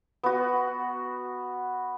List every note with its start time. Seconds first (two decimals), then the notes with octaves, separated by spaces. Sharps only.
0.23 B3 F#4